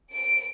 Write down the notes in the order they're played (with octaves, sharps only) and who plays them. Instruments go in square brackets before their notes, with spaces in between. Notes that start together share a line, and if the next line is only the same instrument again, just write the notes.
[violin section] D7